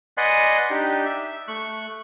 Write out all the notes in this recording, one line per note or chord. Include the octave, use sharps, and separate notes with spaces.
B4 D5 D#5 F#5 G#5 C6
D4 D#4 G4
E5
A3 C#6 F#6